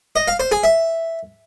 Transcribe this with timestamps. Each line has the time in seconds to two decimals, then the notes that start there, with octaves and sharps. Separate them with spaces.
0.16 D#5
0.28 F5
0.40 C5
0.52 G#4
0.64 E5